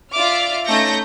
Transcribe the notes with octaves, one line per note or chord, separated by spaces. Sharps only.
F4 D5 E5 D6 F6
A3 C#4 D#4 G6 A#6 C#7